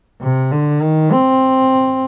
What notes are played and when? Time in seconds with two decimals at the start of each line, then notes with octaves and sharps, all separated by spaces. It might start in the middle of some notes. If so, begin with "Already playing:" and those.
0.21 C3
0.52 D3
0.82 D#3
1.12 C4